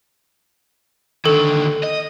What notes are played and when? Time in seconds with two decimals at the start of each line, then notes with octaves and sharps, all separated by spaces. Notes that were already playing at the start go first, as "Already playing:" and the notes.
1.26 D#2 D3 A4
1.83 D#5